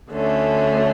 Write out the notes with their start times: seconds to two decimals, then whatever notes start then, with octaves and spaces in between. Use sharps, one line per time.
0.10 D2 D3 A3 C#4